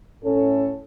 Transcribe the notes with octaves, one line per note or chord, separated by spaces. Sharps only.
A2 C#4 A4